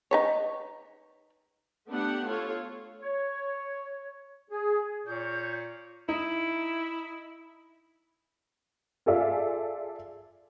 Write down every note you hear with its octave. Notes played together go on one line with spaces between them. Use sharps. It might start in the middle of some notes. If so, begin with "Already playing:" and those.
D#4 B4 C#5
A3 B3 D4 G4 F#5
F4 A4 C#5
C#5
G#4
A#2 C#5 G6
D#4 E4
F4 G#4 A4 D5 E5 F5